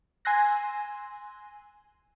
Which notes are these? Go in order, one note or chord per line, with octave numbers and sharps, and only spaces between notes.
G#5 C6 E6 F#6 A#6